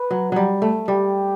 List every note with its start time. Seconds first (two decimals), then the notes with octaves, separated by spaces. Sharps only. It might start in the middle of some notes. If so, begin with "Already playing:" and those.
Already playing: B4
0.11 F#3
0.32 F#3 G3
0.62 A3
0.88 G3 G4